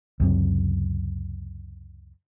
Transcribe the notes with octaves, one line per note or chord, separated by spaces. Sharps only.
C#2 F#2 C3